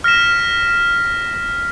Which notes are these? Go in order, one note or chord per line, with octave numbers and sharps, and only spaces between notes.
F6 A#6 B6 E7